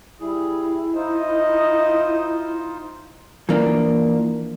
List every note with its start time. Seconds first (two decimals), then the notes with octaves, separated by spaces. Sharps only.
0.20 G3 E4 G#4
0.95 D#4 F4 C5 D#5
3.49 E3 F3 A#3 D4